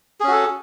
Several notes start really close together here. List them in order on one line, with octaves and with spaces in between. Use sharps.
G#4 C#4 F#4 A4